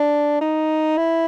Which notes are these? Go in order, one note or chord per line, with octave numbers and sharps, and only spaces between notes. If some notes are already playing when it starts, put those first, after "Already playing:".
Already playing: D4
D#4
E4